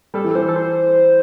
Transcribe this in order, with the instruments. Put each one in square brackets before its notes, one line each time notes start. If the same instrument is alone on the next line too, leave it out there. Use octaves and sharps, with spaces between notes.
[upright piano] G3 [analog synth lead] A4
[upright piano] E3
[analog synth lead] A4
[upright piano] E3 [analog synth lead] C5
[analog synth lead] A4
C5